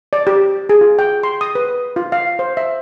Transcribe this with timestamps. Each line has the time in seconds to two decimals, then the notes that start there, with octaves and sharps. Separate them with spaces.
0.13 D5
0.27 G4
0.69 G#4
0.81 F4
0.99 G5
1.23 C6
1.41 D#6
1.55 B4
1.96 F4
2.12 F5
2.39 C5
2.57 E5